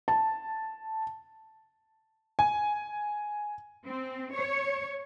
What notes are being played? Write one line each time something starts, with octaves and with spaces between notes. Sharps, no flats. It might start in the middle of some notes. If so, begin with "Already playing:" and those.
A5
G#5
C4
C#5